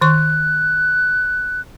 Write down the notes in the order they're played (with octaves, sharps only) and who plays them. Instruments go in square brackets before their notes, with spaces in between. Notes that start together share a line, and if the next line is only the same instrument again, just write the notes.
[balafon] D#3 C#6 [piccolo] F#6